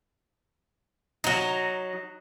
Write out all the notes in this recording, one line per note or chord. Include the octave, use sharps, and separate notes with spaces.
F#3 D#4